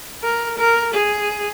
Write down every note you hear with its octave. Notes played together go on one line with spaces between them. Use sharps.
A#4
A#4
G#4